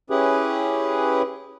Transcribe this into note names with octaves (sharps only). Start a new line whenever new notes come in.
C#4 E4 G4 G#4 B4